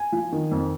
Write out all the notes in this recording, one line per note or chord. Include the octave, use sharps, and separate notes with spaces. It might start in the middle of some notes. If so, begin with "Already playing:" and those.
Already playing: G#5
F3
D#3
F2